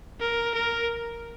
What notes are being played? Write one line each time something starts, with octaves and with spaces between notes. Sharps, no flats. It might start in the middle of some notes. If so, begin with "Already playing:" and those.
A#4
A#4